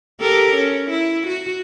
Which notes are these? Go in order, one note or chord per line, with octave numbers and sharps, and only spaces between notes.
G4 A4 A#4
C#4
E4
F#4